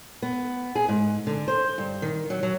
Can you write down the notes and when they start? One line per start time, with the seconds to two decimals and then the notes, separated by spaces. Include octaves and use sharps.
0.22 B3
0.75 G#4
0.88 G#2
1.27 D3
1.48 C5
1.78 G2
2.02 D#3
2.30 F#3
2.43 F#3